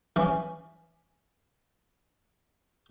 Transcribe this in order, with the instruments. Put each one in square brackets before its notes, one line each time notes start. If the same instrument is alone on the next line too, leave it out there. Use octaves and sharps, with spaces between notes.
[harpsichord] E3 C#4